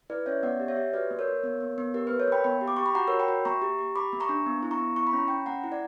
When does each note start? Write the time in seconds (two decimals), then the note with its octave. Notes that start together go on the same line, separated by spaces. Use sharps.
0.10 E4 B4 D5
0.26 C#4 C#5 E5
0.43 B3 D5 F#5
0.60 G4
0.68 C#5 E5
0.76 G4
0.93 F#4 B4 D5
1.11 A#3
1.19 A#4 C#5
1.27 A#3
1.44 B3
1.61 B3
1.78 B3
1.94 G4 A#4
2.07 A#3 B4
2.19 A#4 C#5
2.28 A#3 G5 B5
2.44 B3 G5 B5
2.61 G4
2.68 D6
2.77 G4 C#6
2.86 B5
2.95 F#4 F#5 A#5
3.08 F#4 A#4 C#5
3.20 G5 B5
3.28 F#4
3.45 A#3 A#5 C#6
3.62 G4
3.79 G4
3.96 G4 B5 D6
4.13 A#3
4.20 A#5 C#6
4.29 D4
4.46 B3
4.63 E4
4.71 A#5 C#6
4.80 B3
4.96 E4 C#6
5.07 B5
5.13 C#4 A#5
5.28 C#4 G5 B5
5.46 A#3 F#5 A#5
5.64 E4
5.72 D5 F#5